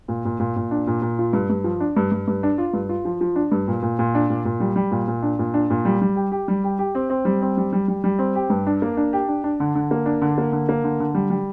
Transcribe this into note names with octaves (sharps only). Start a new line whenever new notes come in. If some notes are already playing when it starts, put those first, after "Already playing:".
A#2
A#2
A#2
A#2
D4
A#2
A#2
F4
G2
G2
F3
D4
G2
G2
G2
D4
F4
G2
F4
F3
F3
D4
G2
A#2
A#2
A#2
D4
A#2
A#2
G3
G3
A#2
A#2
D4
A#2
D4
A#2
G3
G3
G4
G4
G3
G4
G4
C4
C4
G3
C4
G3
G3
G3
G3
C4
G4
G2
D4
A#3
D4
G4
D4
D4
D3
D3
A#3
D4
D3
A#3
D3
A#3
D3
D3
G3
G3